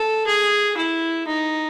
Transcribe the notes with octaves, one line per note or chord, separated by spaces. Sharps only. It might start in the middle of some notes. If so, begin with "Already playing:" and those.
Already playing: A4
G#4
E4
D#4